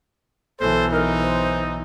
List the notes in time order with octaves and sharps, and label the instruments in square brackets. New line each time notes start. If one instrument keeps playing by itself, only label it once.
[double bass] B1 E3 [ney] A4 [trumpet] C5
[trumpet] D#4 [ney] A#4
[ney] C5